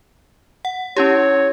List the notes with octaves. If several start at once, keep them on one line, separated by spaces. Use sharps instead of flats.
F#5
C#4 E4 G4 C#5